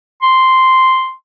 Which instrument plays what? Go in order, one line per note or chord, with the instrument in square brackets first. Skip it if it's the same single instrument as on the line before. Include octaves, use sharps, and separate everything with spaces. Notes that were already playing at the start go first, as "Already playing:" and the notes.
[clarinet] C6